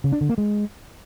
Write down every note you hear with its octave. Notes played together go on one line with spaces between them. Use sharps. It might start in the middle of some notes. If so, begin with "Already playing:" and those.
C#3
D4
D3
A#3
G#3